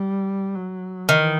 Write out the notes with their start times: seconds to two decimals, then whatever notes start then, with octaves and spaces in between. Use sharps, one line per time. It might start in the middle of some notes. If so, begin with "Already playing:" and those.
Already playing: G3
0.55 F#3
1.09 D#3 E3